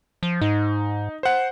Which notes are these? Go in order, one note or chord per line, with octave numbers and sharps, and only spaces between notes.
F3
G#2 D#4
C5 F#5